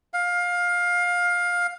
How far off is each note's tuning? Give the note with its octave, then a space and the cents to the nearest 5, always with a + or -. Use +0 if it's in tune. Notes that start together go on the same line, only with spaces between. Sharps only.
F5 +20